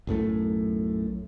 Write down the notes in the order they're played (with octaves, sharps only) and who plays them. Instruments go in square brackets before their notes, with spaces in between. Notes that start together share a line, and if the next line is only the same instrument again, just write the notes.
[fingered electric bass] B1 F#2 A2 A3